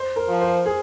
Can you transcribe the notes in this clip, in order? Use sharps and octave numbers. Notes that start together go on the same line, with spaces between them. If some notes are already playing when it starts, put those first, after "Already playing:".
Already playing: C5
A#4
F3
C5
G#4